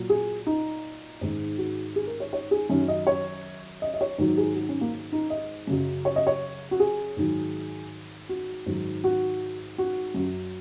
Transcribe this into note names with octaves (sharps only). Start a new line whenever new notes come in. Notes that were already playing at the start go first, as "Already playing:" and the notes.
Already playing: A#2 F#3
G#4
D#4
G#2 D#3 G#3
F#4
G#4
A#4
C#5
C#5
G#4
F#2 D#3 F#3 C#4
D#5
C#5
D#5
D#5
C#5
G#2 D#3 F#3
G#4
F#4
C#4
A#3
D#4
D#5
F#2 C#3 F#3
C#5
D#5
C#5
F#4
G#4
G#2 D#3 F#3
F#4
G#2 D#3 F#3
F#4
F#4
F#2
F#3